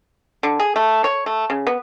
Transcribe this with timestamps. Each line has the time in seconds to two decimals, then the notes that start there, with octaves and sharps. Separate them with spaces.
0.43 D3
0.60 G#4
0.76 A3
1.04 C#5
1.26 A3
1.50 C#3
1.67 B3